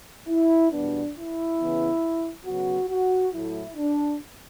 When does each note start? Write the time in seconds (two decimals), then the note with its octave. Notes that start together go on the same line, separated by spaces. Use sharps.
0.28 E4
0.72 E2 B2 G3 B3 D4
1.15 E4
1.60 C#3 E3 B3
2.46 C#3 F#3 B3 F#4
2.90 F#4
3.34 A2 F#3 A3 E4
3.77 D4